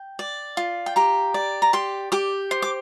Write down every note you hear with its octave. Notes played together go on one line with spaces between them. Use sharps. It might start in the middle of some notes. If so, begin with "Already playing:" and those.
Already playing: G5
D5
F4
G5
G4 A#5
D5
A#5
G4 C6
G4 D6
C5
D6